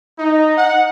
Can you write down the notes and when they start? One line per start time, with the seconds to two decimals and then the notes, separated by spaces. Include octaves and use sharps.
0.18 D#4
0.56 F#5